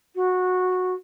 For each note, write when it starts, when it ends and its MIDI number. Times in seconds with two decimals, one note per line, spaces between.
0.15 0.93 66